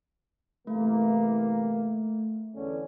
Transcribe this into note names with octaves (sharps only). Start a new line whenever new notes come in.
C2 E3 A3 A#3
E2 D3 C#4